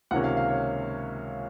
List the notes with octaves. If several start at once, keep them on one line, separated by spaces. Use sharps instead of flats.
C#2 C3 D#3 A#3 C#4 F#5
F5
F5
C#5